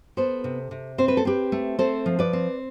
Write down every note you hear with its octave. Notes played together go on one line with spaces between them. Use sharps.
B3 A4 C5
C3
C3
C4 C5
B4
A4
C4 G4 B4
A3
C4 A4 C5
F3
B4 D5
C4